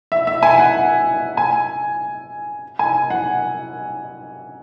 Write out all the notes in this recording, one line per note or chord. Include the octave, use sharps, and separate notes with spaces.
E5
E5
G#5
F#5
G#5
G#5
F#5